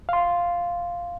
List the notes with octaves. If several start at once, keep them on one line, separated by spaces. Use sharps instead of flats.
F5 C6